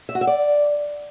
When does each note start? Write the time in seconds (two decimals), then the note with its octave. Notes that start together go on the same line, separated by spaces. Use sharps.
0.09 E5
0.15 F#4
0.21 E5
0.27 D5